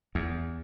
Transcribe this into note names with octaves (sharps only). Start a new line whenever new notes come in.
E2